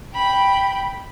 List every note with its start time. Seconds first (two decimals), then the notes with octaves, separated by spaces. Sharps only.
0.15 G5 B5